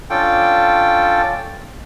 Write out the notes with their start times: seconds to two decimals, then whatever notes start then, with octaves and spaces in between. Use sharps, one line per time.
0.10 C#4 D4 F4 A4 G5